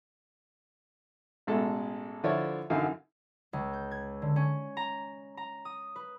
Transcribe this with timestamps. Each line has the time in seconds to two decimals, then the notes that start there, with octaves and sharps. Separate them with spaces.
1.47 A1 B2 G#3 A4
2.24 D3 F3 E4 F4 C#5 D5
2.70 F#2 D3 E3 D#4 F5
3.53 C#2
3.73 G6
3.91 G#6
4.22 D3
4.36 C#4
4.77 A#5
5.37 A#5
5.65 D#6
5.96 B4